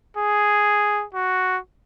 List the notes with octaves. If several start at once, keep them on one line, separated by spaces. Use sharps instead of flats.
G#4
F#4